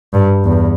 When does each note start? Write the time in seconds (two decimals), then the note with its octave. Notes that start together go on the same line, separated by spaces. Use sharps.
0.14 G2
0.45 E2